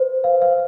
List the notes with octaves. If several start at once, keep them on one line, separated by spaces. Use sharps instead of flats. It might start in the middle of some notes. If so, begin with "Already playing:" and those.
Already playing: B4 C5
F5
F5